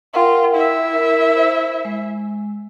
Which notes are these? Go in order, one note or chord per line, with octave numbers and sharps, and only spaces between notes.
F4 A#4 F#5 G5
E4 E5
A#4
C5
G#3